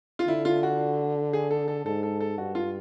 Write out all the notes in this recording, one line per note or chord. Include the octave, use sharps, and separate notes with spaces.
F4
D3 E4
F4
F#4
G#4
A4
A4
G#2 A4
A4
A4
G2 F#4
F4